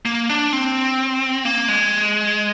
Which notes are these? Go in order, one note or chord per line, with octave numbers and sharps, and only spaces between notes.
A#3
D4
C4
A#3
G#3